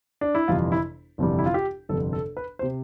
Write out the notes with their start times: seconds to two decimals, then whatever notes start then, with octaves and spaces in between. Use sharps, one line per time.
0.21 D4
0.35 E4
0.48 G1 F2 C3 E3 G3 F4
0.72 E4
1.18 G1 F2 C3 E3 G3
1.39 E4
1.46 F4
1.54 G4
1.89 G1 F2 C3 A4
2.13 A4
2.37 B4
2.59 C5
2.63 C3